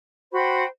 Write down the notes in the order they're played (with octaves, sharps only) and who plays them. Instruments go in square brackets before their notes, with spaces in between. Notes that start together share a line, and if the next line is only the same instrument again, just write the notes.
[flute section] F#4 C5 G5 B5